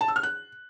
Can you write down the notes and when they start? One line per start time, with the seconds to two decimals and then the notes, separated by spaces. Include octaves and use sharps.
0.01 A5
0.08 E6
0.16 F6
0.23 F#6